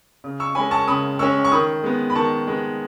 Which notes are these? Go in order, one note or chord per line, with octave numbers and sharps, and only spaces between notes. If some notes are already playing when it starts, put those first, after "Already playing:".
C#3
C#6 E6
G#3 C#4 G#5 B5
A5 C#6
C#3 B5 D#6
G#3 C#4 C#6 E6
C#6
D#3 B5 D#6
G#3 B3
B5
D#3 A5 C#6
G#3 B3